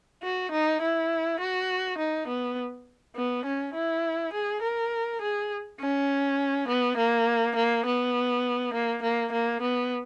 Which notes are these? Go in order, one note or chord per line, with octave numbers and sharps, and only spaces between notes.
F#4
D#4
E4
F#4
D#4
B3
B3
C#4
E4
G#4
A#4
G#4
C#4
B3
A#3
A#3
B3
A#3
A#3
A#3
B3